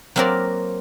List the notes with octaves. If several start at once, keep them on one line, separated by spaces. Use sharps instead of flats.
F#3 A#3 C4 F#4 A#4 D5